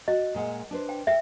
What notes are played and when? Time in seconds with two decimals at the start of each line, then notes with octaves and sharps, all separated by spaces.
0.08 F#4 D#5
0.34 A#2 G#3 F#5
0.71 D4 B4 C5
0.89 G5
1.07 A4 E5 F5 G5